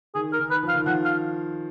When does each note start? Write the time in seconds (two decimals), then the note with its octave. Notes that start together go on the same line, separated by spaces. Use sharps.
0.15 D#3 G#4
0.33 A#4
0.39 D#3
0.50 B4
0.63 F3
0.68 F5
0.75 D#3
0.86 F3 F#5
1.05 F5